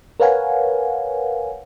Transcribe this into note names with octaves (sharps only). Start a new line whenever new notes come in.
A#4 B4 C#5 F5 F#5 G#5